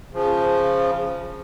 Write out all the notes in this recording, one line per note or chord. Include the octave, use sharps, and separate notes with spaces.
C#3 F3